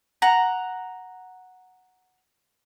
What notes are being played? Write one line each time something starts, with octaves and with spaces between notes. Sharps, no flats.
F#5 A#5